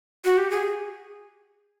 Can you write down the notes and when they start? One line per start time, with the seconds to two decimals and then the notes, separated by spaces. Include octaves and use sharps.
0.25 F#4
0.38 G4
0.50 G#4